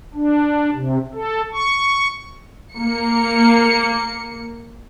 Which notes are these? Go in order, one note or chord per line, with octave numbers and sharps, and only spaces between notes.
D4
C3
A4
C#6
A#3 C#7